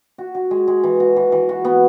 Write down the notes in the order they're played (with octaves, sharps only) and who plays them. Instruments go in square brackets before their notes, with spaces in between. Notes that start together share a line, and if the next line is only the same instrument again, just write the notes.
[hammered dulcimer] F#4
F#4
G#3
G#3
E3
F#4
E3
E3
F#4
B3